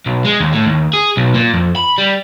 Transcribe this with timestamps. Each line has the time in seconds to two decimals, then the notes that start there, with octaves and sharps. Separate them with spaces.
0.06 B1
0.25 G#3
0.40 D#2
0.53 A2
0.66 D#2
0.93 G#4
1.17 B1
1.35 A#2
1.54 F2
1.76 B5
1.98 G3